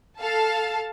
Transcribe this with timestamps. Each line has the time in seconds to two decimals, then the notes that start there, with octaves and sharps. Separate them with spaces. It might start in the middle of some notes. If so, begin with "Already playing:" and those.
0.20 A4 F5 A5